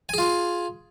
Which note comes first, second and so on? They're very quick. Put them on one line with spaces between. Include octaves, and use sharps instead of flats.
G#5 G#4 F4